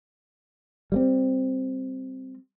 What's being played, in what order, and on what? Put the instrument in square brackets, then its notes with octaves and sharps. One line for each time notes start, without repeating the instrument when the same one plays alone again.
[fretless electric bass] G3 A3 C4